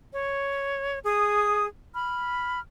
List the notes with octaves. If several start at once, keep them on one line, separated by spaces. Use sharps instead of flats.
C#5
G#4 D#6
B5 F6